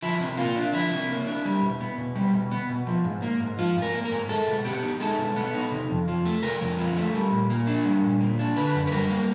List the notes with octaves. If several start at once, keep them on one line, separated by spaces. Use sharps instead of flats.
F3 E4
C3
A#3 F4
D4
F3 E4
C3
A#3
D4
G3
B2
B3
B2
G3
B2
B3
B2
F3
G#2
A#3
G#2
F3 F4
G#2
A#4
A#3
A#4
G#2
G#3 A4
B2
B3 G4
D#4
G#3 A4
B2
B3
D#4
C3
F2
F3
A3
C3 A#4
F2
F3
A3
G3
A#2
A#3
D4
G3
A#2
A#3
D4
D3 B4
F#2
B4
G3 A#4
A#3